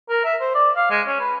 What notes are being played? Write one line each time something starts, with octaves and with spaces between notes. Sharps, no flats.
A#4
E5
C5
D5
F5
G#3
C#4
B4